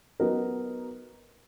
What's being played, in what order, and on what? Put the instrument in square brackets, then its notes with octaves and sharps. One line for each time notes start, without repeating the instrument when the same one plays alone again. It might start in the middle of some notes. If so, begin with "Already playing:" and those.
[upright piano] F#3 B3 D#4 A#4